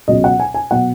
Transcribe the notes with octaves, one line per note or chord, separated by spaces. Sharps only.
C#2 B2 F#3 D#5
F#5
G#5
G#5
B2 F#3 F#5